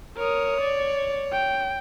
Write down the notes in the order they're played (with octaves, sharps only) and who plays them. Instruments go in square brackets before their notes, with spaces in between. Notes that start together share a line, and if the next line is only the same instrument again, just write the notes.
[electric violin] A#4 D#6 [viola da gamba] C#5
[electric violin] D5
G5